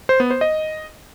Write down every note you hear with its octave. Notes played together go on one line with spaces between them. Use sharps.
C5
B3
C5
D#5